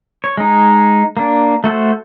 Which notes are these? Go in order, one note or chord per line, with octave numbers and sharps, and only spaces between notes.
C#5
G#3 D#4
A#3 D4
A3 F#4 A4 C5